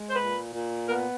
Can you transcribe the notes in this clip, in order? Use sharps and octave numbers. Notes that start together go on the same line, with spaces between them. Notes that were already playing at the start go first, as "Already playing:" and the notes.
Already playing: G#3
C5
A#2 B4
A#2
B3 A#4